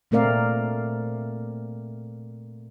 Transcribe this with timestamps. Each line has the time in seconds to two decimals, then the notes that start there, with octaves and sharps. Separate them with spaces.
0.11 A#2 A3 C4 A#4 D5 F5